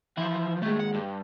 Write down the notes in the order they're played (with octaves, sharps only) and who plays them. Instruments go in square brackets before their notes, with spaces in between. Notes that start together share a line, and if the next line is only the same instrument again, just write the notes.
[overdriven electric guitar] E3 F3 [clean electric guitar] E4
[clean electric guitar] D#2 G#3 [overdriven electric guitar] A3
[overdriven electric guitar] F#5
G2